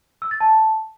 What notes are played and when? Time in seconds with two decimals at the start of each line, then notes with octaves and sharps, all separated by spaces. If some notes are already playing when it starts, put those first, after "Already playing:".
0.22 E6
0.31 A6
0.40 A5